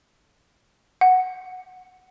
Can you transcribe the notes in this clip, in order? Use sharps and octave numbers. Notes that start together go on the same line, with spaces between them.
F#5